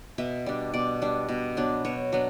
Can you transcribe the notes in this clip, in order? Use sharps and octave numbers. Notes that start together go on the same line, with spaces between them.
B2 E5
G3 D4
B2 D5
G3 D4
B2
F#3 B3 D4
B2 C#5
F#3 B3 D4